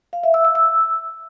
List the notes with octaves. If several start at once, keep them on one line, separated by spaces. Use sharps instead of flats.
F5
E5
E6
E6
E6